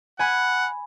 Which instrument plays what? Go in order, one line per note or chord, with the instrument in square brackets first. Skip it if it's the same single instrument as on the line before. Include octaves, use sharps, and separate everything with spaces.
[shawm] F#5 [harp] G#5 B5